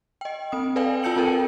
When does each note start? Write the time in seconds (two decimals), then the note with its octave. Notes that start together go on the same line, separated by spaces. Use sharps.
0.21 D#5 G5
0.52 C4 D#6
0.76 A4 B4 D5 F5 G5 G#5
1.03 F4 A5 E6 G6 C#7 F#7
1.16 C4 F4 A4 A#4 G5